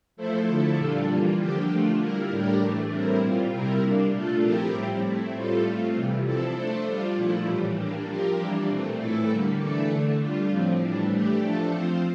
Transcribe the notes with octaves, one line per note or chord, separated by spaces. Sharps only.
F3 A3 E4 A4 C5
D3 F3 A3 E4 A4
A#2 G3 D4 F4 A4
E3 G3 A#3 F4
D3 F3 A#3 D4 G4
D3 A3 D4 F4
G3 A#3 E4 A#4
A2 G3 D4 G4 A#4
A2 E3 A3 D4
A2 G3 C4 E4 A#4
A#2 G3 C4 F4
C3 G3 C4 E4 A#4
G3 A#3 D4
A#2 A3 D4 F4 A4
F3 C4 E4 G4 A#4
A2 G3 C4 E4
A3 C4 E4
A2 G3 C4 F4 A4
A3 C4 F4
C3 E3 G3
F3 C4 E4 A4
A3 D4 A4 C5
G3 D4 F4
A#2 F3 A3 E4
A2 E3 G3
G3 A#3 D4
F3 C4 G4 A#4
E3 G3 A#3 D4
A#2 A3 C4
A2 E3 A3 E4 A4
D3 G3 A#3
E3 A3 D4 A4
D3 A3 D4
G3 D4 F4
A2 F3 C4
A2 E3 G3 D4
E3 A3 D4 G4
F3 A3 D4 A4
F3 C4 F4 C5